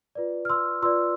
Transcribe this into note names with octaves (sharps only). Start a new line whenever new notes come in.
F4 B4 D5
F6
C6 E6
F4 B4 D5 C6 E6